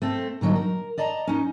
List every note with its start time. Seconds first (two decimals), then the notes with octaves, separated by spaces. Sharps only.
0.02 A3 C4 A4
0.41 A#2 D3 F#3 G3 D#4
0.56 A#4
0.98 D5 D#5 A5 A#5
1.27 C#4 D#4